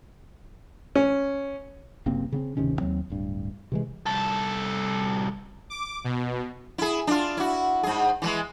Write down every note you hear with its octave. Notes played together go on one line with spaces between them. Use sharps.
C#4
F#1 C3 A#3 C4
C#3 B3 C4
D1 C3 D#3 C#4
D#2 F#3 C4
D1 G2
C3 E3 G#3
C2 A4
D6
B2
E4 G#4
D4 F4
E4 F#4
G#2 G#4
E3 G3 G#3